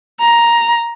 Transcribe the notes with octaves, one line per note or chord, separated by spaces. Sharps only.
A#5